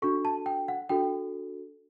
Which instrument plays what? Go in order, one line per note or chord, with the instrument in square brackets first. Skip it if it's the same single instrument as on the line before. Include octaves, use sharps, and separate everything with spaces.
[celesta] D4 F#4 A4 C#6
A5
G5
F#5
D4 F#4 A4 G5